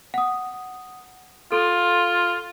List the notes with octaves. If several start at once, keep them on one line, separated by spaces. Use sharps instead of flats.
F#5 D#6
F4 A4